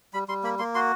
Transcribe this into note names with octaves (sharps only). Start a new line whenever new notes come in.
G3 B5
G3 C6
A#3 B5
A#3 C6
F#4 C6